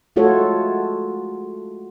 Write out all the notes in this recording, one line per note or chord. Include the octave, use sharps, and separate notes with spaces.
G#3 A3 F4 F#4 A4 C#5